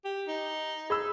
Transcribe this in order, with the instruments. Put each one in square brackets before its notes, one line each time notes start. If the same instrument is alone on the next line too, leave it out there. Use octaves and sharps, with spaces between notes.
[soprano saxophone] G4
D#4
[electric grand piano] G#4 B5 E6